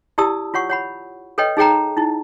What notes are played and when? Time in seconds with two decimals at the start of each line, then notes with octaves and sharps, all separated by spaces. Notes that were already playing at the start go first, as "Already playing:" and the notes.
0.18 E4 G4 D5 A5 D#6 E6
0.54 F4 C#5 F#5 C#6
0.70 C#5 F#5 B5
1.38 A4 B4 C#5 D#5 G5
1.57 D#4 G#4 C#5 G5 A#5
1.97 D#4 E4